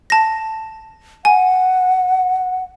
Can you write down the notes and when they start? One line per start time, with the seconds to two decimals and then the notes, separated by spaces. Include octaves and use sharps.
0.10 A5 A#6
1.25 F#5 G#5